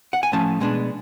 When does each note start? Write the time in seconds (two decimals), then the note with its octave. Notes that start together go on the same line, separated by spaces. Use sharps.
0.13 F#5
0.23 G#5
0.32 A2 F3 A3 C#4 A5
0.61 B2 G#3 B3 D4